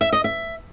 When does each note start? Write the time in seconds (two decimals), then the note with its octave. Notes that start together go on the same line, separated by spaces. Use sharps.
0.01 E5
0.13 D#5
0.24 E5